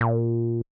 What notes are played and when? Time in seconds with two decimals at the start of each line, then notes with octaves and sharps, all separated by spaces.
0.01 A#2